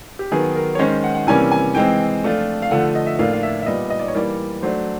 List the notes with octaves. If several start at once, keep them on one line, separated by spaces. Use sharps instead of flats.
G4
D#3 F#3 B3 G#4
A#4
C#5
D#3 G#3 C#4 C5
F#5
F#5
C3 E3 G3 A#3 C#4 G#5
G#5
E3 G#3 C4 G5
F3 A3 D4 F4
F5
D3 F3 A3 F#5
D#5
E5
A2 F3 A#3 D4 F4 F5
F5
E5
E5
A#2 G3 B3 D#5
D#5
D5
C#5
E3 G3 A#3 D5
F#3 A3 D4 C5